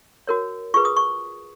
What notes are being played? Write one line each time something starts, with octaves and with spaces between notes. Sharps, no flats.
F#4 A#4 C#5
F4 G#4 B4 C#6
D#6
C#6